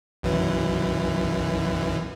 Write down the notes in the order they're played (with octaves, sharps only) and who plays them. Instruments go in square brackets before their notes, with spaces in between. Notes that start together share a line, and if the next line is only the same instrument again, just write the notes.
[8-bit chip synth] B1 F#2 E3